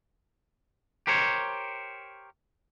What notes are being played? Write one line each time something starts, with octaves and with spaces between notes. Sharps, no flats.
G4 A#4 C5 C#5